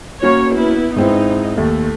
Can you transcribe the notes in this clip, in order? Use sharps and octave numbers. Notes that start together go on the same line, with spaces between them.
A#3 C#4 F#4 C#5
B3 E4
G#2 C4 D#4 E4
D#2 A3